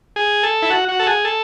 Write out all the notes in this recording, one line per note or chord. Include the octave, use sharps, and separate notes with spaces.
G#4
A4
E4
F#4
F#4
A4
G#4
A4